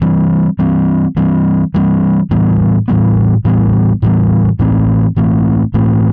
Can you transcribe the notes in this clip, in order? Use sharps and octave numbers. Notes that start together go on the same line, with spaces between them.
E3 G3 C4
E3 G3 C4
E3 G3 C4
E3 G3 C4
A2 E3 G3 B3
A2 E3 G3 B3
A2 E3 G3 B3
A2 E3 G3 B3
A2 E3 A3 C4
A2 E3 A3 C4
A2 E3 A3 C4